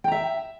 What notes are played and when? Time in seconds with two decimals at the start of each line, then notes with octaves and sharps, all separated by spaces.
0.04 G5
0.08 A#5
0.12 E5